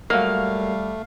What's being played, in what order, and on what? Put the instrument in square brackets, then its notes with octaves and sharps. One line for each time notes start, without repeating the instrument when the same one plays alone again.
[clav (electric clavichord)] F#3 A#3 [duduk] G3 [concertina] A3 [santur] F5